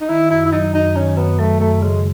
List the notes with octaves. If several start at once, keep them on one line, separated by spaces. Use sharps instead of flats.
D#4
D#3 E4
F#2 E4
E4
F#3 D#4
F#2 D#4
D#3 C#4
F#2 B3
F#3 A3
F#2 A3
C#3 G#3